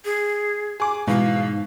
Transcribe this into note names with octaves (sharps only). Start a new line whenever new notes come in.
G#4
G#4 D6
G#2 B2 E3 F5